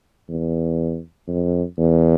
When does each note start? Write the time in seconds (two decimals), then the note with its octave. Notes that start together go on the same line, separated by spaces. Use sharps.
0.29 E2
1.28 F2
1.78 E2